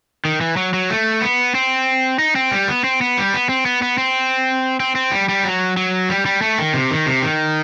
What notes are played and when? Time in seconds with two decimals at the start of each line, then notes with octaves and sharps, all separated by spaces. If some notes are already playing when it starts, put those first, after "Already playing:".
0.25 D#3
0.41 E3
0.57 F#3
0.74 F#3
0.90 A3
1.22 B3
1.55 C4
2.19 D#4
2.36 C4
2.51 G3
2.68 B3
2.84 C4
3.01 B3
3.18 G3
3.34 B3
3.49 C4
3.66 B3
3.82 B3
3.98 C4
4.80 C4
4.95 C4
5.12 G3
5.29 G3
5.44 F#3
5.77 F#3
6.09 G3
6.26 G3
6.42 A3
6.59 D#3
6.74 C3
6.91 D#3
7.06 C3
7.23 D#3